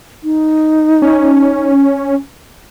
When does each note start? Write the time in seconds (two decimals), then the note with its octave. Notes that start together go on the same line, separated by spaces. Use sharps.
0.24 D#4
1.02 C#4